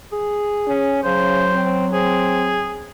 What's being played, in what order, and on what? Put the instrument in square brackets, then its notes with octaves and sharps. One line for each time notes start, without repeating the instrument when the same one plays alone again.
[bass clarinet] G#4
[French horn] C#4
[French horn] C#3 [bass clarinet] F#3 [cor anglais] C5
[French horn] C4
[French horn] C4 [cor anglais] G#4